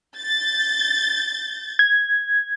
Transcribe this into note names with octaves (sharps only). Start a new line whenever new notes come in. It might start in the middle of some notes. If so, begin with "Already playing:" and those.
G6 A6
G#6